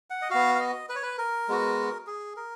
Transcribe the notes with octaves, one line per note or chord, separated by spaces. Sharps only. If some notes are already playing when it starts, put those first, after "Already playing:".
F#5
D#5
B3 F#4 F5
F5
D#5
B4
C#5
B4
A#4
G#3 B3 F#4
G#4
A#4